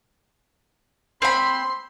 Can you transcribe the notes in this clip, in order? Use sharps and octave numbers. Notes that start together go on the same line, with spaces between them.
C4 B5 C6